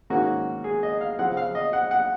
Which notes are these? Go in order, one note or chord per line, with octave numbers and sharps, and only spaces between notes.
G#2 D#3 A#3 C#4 F#4
G#4
D#5
F5
C#3 F3 C4 F#5
F5
D#5
F#5
F#5